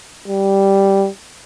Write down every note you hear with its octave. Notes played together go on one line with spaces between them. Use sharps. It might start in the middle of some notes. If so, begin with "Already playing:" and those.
G3